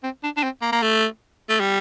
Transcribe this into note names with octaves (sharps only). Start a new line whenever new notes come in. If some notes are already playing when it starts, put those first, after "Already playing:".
C4
D4
D4
C4
A#3
A#3
A3
A3
G3